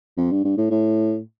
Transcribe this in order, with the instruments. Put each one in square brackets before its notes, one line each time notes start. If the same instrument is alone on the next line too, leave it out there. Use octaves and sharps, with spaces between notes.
[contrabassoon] F2
G2
G2
A2
A2